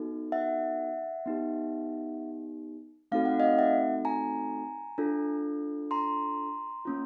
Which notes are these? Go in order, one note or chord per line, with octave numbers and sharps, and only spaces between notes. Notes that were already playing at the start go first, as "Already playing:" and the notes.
Already playing: B3 D#4 F#4 A4
E5 F#5
B3 D#4 G4
A3 C4 D#4 F#4 A4 F5
F#5
D#5 F5
E5 F#5
G#5 A#5
D4 F4 A4
A#5 C6
A#3 C#4 F4